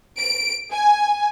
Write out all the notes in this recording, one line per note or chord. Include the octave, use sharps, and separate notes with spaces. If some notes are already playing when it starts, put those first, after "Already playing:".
D7
G#5